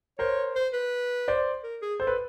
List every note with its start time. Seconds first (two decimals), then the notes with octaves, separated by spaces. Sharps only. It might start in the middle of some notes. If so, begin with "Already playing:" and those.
0.18 A#4 C5 C#5
0.55 C5
0.73 B4
1.28 C5 D5
1.63 A#4
1.82 G#4
2.00 A4 C5
2.07 B4